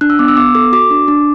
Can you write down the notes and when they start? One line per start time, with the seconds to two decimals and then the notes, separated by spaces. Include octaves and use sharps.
0.01 D4 F#6
0.10 E6
0.19 B3 D6
0.28 E6
0.37 B3 D6
0.55 A4 D6
0.73 F#4 D6
0.91 D4
1.08 D4